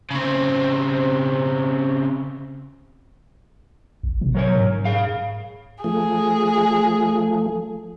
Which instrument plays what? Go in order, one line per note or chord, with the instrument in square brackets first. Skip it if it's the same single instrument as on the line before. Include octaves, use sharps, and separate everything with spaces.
[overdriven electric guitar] C#3 C4
[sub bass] G#1
B2
[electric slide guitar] F#3 A#4 C#5
[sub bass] G#2
[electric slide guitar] G#4 F5
[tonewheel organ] F3 A3 [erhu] G#4